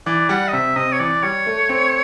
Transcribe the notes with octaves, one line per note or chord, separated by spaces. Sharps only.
E3 D5
G3 F#5
D#5
C3 E5
C3 D#5
C#5
E3 D5
G3 C#5
A3
C4